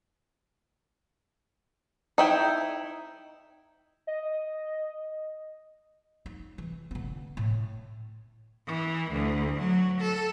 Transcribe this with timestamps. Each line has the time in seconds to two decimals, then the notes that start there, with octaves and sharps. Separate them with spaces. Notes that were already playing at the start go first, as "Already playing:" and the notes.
2.18 D#4 E4 G5
4.07 D#5
6.26 D#4
6.58 E3
6.91 D3 B3
7.37 A2
8.67 E3
9.11 D2
9.59 F#3
10.01 A4